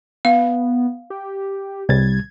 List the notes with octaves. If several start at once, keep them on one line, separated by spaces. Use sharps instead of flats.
B3 F5
G4
C2 G3 G#6 A6